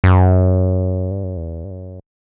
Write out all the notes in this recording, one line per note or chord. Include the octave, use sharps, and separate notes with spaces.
F#2
G2
F#2
E2
G2
F#2